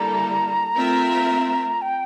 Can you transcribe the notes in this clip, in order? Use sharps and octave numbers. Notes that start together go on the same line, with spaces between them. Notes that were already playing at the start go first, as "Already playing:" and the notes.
Already playing: D3 G3 A#3 E4 A4 A#5
A3 C4 F4 A#4 E5
G5